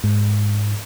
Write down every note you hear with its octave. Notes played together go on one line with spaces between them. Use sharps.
G#2